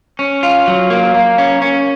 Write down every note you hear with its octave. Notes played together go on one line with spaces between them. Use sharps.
C#4
F4
F#3
A#3
A#3
C#4
C#4